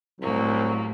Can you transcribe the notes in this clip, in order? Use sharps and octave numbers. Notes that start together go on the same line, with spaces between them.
C2 A2 F#3 A#3